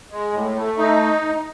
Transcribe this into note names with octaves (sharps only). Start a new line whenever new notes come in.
G#3
A2
A3
D#4